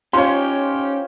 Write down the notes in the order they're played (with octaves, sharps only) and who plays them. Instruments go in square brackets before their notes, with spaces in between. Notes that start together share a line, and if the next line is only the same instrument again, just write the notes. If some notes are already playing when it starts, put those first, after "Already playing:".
[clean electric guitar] C#4 D#4 [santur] F4 C5 C#5 [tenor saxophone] G4 [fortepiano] C6